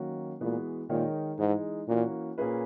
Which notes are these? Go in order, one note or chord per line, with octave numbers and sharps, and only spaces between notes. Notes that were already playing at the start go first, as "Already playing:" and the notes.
Already playing: D#3 F#3 A#3 C#4 F#4
A#2 E3 G#3 B3 F#4
A#2 D#3 G#3 D#4 A#4 C#5
G#2 E3 G#3 D#4
A#2 E3 A#3 C#4 F#4
A#2 A#3 C#4 G#4 B4